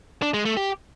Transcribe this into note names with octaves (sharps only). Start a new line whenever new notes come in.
D4
G#3
A3
G4